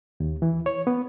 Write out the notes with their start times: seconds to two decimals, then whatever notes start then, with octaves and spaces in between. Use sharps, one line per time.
0.20 D#2
0.42 E3
0.66 C#5
0.87 B3